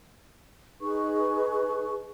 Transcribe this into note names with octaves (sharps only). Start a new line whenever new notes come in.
D#4 G#4 B4 C#6